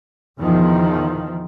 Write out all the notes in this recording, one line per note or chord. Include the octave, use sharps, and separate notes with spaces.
E2 B2 D#3 F3